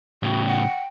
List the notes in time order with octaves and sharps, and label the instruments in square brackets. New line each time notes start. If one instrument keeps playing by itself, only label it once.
[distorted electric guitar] A2 C#3 [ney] F#4 [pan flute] G5
[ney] F#5